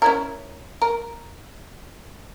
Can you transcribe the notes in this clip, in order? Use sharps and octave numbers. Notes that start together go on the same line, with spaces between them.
C#4 E4 A#4
A#4